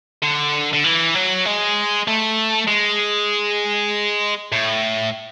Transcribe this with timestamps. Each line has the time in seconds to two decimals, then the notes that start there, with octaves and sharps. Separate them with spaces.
0.23 D3
0.73 D3
0.84 E3
1.15 F#3
1.46 G#3
2.08 A3
2.68 G#3
4.52 A2